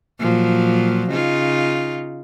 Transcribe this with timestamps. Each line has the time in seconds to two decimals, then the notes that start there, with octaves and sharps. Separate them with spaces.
0.20 A#2 F3 F#3
1.09 C#3 D#4 F4